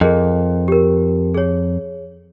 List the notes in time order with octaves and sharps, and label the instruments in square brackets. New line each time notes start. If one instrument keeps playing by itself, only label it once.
[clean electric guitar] F2 [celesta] G#4 A#4 D#5
[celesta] G4 A#4
G#4 C#5